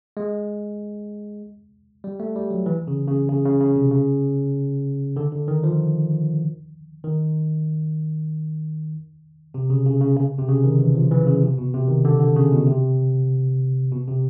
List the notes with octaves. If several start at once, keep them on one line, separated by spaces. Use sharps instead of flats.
G#3
G3
A3
G3
F#3
E3
C#3
C#3
C#3
C#3
C#3
C3
C#3
D3
D3
D#3
F3
D#3
C3
C#3
C#3
C#3
C#3
C3
C#3
D#3
E3
F3
E3
C#3
C3
B2
C3
D#3
D3
D3
C#3
B2
C3
B2
C3